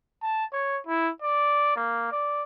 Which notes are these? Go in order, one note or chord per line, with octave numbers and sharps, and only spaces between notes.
A5
C#5
E4
D5
A#3
D5